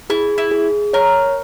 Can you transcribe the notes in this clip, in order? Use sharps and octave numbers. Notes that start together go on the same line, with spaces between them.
E4 G#4
E4
G#4
A#4 C#5